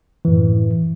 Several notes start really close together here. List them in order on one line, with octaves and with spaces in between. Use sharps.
E3 F#2 A2